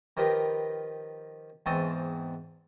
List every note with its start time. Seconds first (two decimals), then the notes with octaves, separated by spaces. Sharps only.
0.17 D#3 F3 G4 A#4 B4
1.66 E2 G#2 C4 A5 C#6 D#6